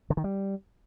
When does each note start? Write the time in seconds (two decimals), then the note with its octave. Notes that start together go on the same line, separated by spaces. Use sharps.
0.10 D3
0.17 D#3
0.24 G3